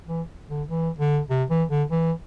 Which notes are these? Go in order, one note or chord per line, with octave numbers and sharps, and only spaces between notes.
E3
D3
E3
D3
C3
E3
D3
E3